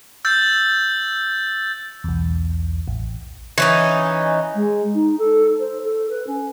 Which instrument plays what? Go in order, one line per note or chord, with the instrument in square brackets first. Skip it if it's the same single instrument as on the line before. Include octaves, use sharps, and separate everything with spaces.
[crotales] E6 G6 A6
[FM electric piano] B1 E2
A1
[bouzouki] E3 C#4 D#4
[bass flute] G#3
D#4
A4
C5
A4
B4
C#4